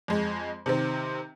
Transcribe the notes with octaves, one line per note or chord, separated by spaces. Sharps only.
F2 G#3
C3 D#3 C4